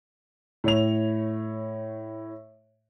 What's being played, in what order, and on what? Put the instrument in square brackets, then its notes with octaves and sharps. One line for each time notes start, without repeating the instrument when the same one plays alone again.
[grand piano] A2 C#5 F7